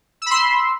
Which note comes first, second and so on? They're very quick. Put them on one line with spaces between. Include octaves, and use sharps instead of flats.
E6 B5 C6